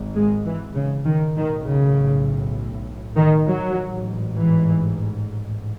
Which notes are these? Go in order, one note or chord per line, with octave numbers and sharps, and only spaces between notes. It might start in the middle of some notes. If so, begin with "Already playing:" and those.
Already playing: G#1 G#2
G#3
E3
C#3
D#3
B1 A2 D#3
C#3
D#3
F#3
A1 G#2
E3